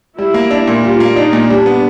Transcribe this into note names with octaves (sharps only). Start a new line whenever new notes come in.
G3 E4
A#3
D4
A#2
G3 F4
A#3
D4 D#4
A#2
G3 D4
B3